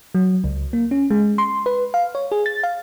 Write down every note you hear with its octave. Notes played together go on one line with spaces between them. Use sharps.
F#3
C#2
A#3
C#4
G#3
C6
B4
F5
C#5
G#4
A6
F5